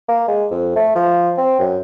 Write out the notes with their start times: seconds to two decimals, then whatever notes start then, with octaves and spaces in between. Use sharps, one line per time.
0.09 A#3
0.28 G#3
0.51 F2
0.76 A3
0.96 F3
1.38 C4
1.59 F#2